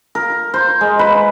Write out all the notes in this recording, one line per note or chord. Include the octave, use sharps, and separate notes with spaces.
A#4
C5
G#3
B4